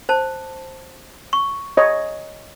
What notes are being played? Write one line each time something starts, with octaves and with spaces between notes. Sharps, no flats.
C5 A5
C#6
C#5 D#5